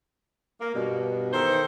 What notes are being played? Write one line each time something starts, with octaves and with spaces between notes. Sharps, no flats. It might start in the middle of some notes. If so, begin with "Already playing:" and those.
A#3
G2 B2
D#3 E3 A4 C5